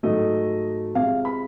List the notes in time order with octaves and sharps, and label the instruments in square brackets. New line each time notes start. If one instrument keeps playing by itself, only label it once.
[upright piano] G#2 D#3 F#3 A3 D#5
C3 F3 G#3 F5
B5